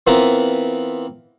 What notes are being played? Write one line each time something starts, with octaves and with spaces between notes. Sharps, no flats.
E3 B3 C4 F4 A#4 B4